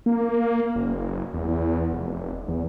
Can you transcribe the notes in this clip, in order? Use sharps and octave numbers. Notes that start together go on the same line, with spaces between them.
A#3
F#1
E2
E2
F1
E2